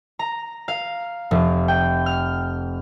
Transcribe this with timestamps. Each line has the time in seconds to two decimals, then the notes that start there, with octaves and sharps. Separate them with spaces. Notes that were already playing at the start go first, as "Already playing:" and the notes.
0.19 A#5
0.68 F5
1.31 F1
1.68 G5
2.06 F6